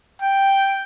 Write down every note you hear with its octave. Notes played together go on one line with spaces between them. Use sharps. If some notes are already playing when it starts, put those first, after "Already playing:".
G5